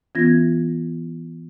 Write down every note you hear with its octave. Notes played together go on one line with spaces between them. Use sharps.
E3 B3 C#4 F4 G#6 A#6